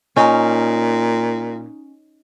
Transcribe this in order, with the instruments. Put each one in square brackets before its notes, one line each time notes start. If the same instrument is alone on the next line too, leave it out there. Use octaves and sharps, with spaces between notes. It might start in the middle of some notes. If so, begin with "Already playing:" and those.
[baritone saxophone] A#2 [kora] C#4 D#4